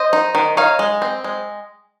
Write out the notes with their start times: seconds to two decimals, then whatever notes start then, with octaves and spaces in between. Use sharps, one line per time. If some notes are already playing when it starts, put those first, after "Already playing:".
Already playing: C5 D#5
0.13 D#4
0.35 D#3
0.57 D#4 C#5 F5
0.79 G#3
1.02 C4
1.24 G#3